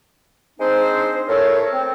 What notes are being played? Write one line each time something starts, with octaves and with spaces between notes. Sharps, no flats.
G#3 C4 D4 D#4 G#4 C5
A2 A4 A#4 C#5
C4